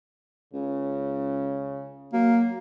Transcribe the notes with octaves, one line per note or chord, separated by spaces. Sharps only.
C#2 C#3
F#3 A#3